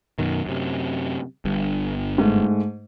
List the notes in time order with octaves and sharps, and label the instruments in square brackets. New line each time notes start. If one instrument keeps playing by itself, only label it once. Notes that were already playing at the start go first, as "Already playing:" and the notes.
[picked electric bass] F#2 B2 D#3
F#2 C3
G1 G2
[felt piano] G#2 A3